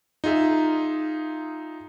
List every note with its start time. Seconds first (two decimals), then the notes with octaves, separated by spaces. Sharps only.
0.24 D#4 F4 G#4 E5